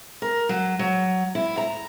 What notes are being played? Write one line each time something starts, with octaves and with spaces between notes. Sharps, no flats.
A#4
F#3
F#3
E4
A#5